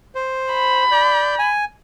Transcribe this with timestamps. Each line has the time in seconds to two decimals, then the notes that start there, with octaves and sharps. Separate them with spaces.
0.15 C5
0.54 B5
0.91 D5 G6
1.39 G#5